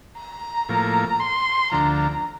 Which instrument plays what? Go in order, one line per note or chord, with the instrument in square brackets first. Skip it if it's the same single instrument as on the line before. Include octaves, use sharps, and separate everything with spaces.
[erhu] A#5
[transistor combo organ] A2 F3 A#3
[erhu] C6
[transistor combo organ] D2 D3 F3 [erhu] A#5